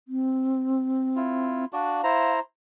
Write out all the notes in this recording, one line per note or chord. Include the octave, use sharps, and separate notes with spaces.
C4
E4 F4
D4 F#4 D5 F5
E4 C5 A#5